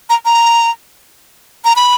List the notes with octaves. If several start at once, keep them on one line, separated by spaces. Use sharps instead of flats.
A#5
A#5
A#5
B5